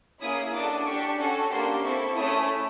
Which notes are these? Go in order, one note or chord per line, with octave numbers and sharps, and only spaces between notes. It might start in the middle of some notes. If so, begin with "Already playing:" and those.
A#3 C#4 E4 G#4 D#6
D4 F#4 A4 D6
D4 G4 C#6
C#4 F#4 A4
A#3 D4 G4 C6
C4 E4 A4 C#6
A3 C#4 E4 G#4 D#6